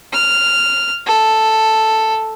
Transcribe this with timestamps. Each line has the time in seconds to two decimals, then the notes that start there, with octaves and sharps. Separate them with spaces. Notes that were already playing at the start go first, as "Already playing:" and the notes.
0.13 F6
1.06 A4